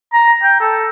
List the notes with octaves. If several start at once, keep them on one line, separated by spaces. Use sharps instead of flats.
A#5
G5
A4